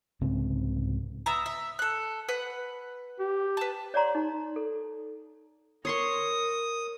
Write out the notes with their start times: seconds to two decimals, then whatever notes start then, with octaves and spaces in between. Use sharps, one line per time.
0.21 C2 G#2 C#3 C4
1.26 B3 E5 A#5
1.46 E5
1.79 A4 F#6
2.29 B4 F#5
3.19 G4
3.57 B4 A5
3.94 C#5 D5 F#5 A#5 C6
4.15 D#4
4.56 A4
5.85 A#4 C#5 C6 C#6 D#6